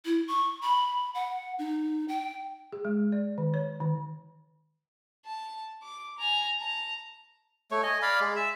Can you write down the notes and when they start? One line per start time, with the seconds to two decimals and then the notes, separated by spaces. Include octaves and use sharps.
0.05 E4
0.28 C#6
0.62 B5
1.15 F#5
1.58 D#4
2.08 G5
2.72 G#4
2.85 G#3
3.12 D5
3.38 D#3
3.54 C#5
3.80 D#3
5.26 A5
5.83 D6
6.18 G#5 A#5
6.58 A5 A#5
7.71 A3 C#5
7.83 D#5 G#5
8.02 D5 F5 B5
8.20 G#3
8.36 E5